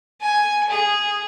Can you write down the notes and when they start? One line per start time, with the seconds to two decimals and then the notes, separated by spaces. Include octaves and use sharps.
0.21 G#5
0.70 G#4